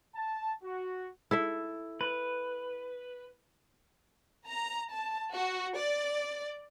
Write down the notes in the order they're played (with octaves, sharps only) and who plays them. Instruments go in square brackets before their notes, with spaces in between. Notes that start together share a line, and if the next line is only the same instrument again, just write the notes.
[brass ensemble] A5
F#4
[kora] E4 A4 E5 [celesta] E6
[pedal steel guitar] B4
[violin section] A#5
A5
F#4
D5